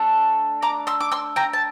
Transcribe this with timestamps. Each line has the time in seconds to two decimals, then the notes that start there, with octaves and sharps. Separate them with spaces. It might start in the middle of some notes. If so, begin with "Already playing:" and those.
Already playing: A3 D4 A4
0.62 A#5 D6
0.87 C6 E6
1.00 D6
1.12 C6 E6
1.36 G5 A#5
1.53 A5